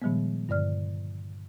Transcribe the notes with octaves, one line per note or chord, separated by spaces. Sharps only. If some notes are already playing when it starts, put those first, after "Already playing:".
A#2 D#3 F3 G3 G#3 B3
G2 D3 D5 F6